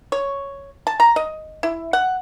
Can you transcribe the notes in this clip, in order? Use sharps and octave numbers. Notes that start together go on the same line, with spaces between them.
C#5
A5
A#5
D#5
E4
F#5